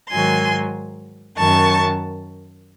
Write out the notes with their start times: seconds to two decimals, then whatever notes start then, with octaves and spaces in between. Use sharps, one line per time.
0.10 G#2 D#3 F#3 G#5 C6
1.37 F#2 D#3 F#3 A5 C#6